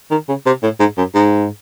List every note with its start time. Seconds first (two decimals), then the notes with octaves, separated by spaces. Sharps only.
0.11 D#3
0.29 C#3
0.46 C3
0.63 A2
0.80 G#2
0.97 F#2
1.15 G#2